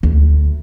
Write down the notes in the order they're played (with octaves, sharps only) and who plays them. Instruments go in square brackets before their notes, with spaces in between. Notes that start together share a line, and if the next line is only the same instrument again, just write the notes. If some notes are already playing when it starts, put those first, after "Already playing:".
[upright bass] D2